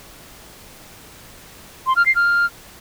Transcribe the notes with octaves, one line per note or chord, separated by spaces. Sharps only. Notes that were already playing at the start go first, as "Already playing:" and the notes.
C6
F6
C7
F6